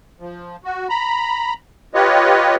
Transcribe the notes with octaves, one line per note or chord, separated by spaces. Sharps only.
F3
F#4
A#5 B5
F4 G4 B4 C#5 D#5